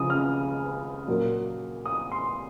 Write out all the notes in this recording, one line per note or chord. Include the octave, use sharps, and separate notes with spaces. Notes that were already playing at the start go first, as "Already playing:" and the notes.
Already playing: C#2 C#3 F3 D#6
F6
A#2 F#3 A#3
D#6
C6